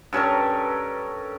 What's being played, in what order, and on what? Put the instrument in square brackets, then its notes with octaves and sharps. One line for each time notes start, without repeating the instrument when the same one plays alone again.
[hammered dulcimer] G2 C#4 A4 A#4